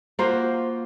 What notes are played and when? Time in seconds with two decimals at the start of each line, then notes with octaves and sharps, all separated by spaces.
0.19 A#3 F4 F#4 C5